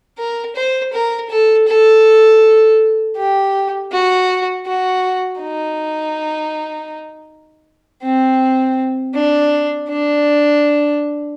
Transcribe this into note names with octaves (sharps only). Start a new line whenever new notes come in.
A#4
C5
A#4
A4
A4
G4
F#4
F#4
D#4
C4
D4
D4